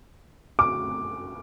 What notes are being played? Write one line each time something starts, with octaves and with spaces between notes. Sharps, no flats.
D6